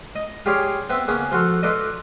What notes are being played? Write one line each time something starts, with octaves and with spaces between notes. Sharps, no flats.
D#5
F4 G4 G#4 C#5 D5 F5
B3 C4 B4 E5
C#3 A#3 B3 C#4
F3 F4 F#4 A4
F4 A4 B4 D5 D#5